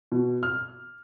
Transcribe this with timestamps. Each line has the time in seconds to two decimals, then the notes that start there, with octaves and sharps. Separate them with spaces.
0.12 B2
0.43 F6